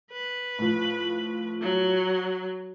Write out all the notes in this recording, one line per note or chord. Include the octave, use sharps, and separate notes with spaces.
B4
A2 F3
F#3